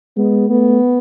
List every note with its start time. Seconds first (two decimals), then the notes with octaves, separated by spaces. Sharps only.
0.17 G#3 B3
0.50 A3 B3